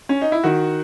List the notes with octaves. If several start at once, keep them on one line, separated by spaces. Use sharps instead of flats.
C#4
D#4
E4
D#3 F#4